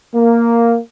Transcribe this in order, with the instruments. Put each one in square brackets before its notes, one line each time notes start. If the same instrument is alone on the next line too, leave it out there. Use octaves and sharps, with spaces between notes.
[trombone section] A#3